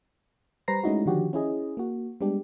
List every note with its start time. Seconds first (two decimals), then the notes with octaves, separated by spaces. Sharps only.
0.68 G3 B4 C5 A#5 A#6 C7
0.84 G#3 A3 C#4 D#4 E4 F#4
1.06 D3 D#3 F3 D4 F#4 G4
1.33 C#4 E4 G#4 D#5
1.77 A#3 F#4
2.21 G3 G#3 B3 D4 G4